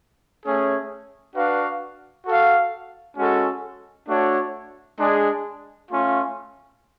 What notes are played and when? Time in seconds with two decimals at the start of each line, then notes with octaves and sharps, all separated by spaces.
0.45 A3 C#4 G#4
1.36 D4 F#4 B4 F5
2.26 F#4 A4 F5
3.17 G#3 C#4 F#4 A4
4.08 A3 D4 F#4 C#5
4.98 G#3 D4 G#4 D5
5.89 A3 C#4 F4